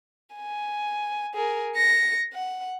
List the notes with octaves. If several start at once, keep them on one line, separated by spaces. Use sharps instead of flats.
G#5
G#4 A#4
A#6 C#7
F#5